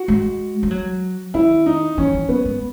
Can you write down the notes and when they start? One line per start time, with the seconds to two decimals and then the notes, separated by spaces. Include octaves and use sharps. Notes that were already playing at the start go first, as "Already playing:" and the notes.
Already playing: F#4
0.08 G#3
0.63 G#3
0.71 F#3
1.34 D#3 E4
1.66 D#4
1.98 E3 C#4
2.13 E3
2.28 F#3 B3
2.45 G#3